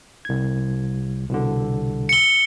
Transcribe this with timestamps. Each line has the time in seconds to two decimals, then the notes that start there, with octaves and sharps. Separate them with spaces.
0.25 C2 G#6
1.30 C2 B2 D3
2.09 C#7 G7